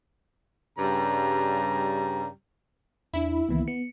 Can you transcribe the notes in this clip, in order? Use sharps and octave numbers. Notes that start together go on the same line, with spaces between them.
G2 C#3 G3 A#5
E2 D4 E4
C#2 D#3 E3 A#3 B3
B3 C#7